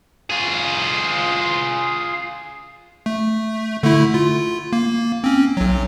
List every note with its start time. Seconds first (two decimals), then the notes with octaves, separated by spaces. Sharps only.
0.30 F4 G#4
3.06 A3
3.83 D3 A3 E4
4.14 F4
4.73 A#3
5.24 C4 C#4
5.57 B1 F#3